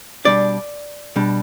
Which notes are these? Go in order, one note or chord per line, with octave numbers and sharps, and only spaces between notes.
B2 G3 D4 D5
B2 G3 D4